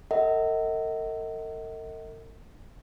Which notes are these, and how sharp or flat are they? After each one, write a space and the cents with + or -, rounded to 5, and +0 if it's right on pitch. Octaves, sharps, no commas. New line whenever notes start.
A#4 -45 D#5 +35 F#5 +20